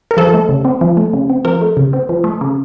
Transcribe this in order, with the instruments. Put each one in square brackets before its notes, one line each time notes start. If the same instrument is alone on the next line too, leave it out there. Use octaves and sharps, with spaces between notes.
[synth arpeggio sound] A#4
F3 A4
A3
C#3
C4
F3
A3
C#3
C4
F3 A#4
A3
C#3
C4
F3
A3
C#3